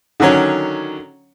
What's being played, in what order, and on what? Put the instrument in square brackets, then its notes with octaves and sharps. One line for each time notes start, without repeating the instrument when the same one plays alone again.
[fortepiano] D3 D#3 F#3 C#4 C#5